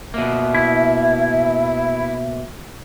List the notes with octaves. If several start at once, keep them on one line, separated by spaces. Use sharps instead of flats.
B2 A#3 E5
E4